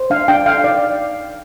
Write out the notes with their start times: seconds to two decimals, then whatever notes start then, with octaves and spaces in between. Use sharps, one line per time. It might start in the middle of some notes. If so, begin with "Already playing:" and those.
Already playing: C5
0.10 D4 F5
0.28 D4 G5
0.46 A4 F5
0.64 D#4 D5